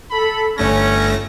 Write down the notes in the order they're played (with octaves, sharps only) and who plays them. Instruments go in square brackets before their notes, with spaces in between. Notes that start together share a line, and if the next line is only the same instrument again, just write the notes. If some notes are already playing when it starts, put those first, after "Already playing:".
[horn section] A4 B5
[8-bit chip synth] G1 A3 A#6 [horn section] C#4